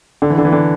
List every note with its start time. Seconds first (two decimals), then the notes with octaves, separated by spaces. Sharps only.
0.22 D3
0.30 E3
0.38 D3
0.45 E3
0.53 D3